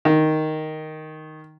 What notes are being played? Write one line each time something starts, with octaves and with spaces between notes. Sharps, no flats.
D#3